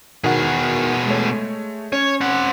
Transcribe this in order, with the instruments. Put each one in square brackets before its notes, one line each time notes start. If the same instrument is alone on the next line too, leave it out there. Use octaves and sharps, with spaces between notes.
[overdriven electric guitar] B2 G#4 [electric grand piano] D#3 F#4 F#5
[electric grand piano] G#3 A3 C#5
[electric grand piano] C#4 [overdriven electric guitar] C#5
[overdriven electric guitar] C4 F#5